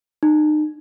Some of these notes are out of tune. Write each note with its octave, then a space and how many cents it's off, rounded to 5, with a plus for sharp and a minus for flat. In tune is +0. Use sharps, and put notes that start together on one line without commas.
D#4 -35